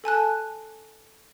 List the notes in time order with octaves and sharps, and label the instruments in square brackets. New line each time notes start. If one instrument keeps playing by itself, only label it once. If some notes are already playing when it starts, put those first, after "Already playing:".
[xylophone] A4 G#5 A5 F#6